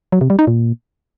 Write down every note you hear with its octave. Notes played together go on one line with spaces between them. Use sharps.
F#3
C3
G3
D#4
A#2